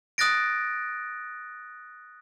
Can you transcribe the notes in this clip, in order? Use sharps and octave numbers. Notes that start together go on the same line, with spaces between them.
D#6 F#6 A6 A#6 D7